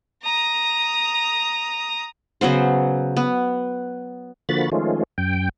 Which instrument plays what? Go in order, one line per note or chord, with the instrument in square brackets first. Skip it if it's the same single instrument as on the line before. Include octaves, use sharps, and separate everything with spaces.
[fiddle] A#5 D#6
[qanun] C#3 F#3 B3 C5
B3
[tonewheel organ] D3 F3 A#3 F#4 B5 A6
D#3 F3 G#3 A3 C#4 F4
F#2 G5